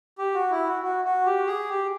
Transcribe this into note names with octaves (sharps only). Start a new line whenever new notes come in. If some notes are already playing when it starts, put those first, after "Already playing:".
G4
F#4
E4
F#4
F#4
F#4
G4
G#4
G4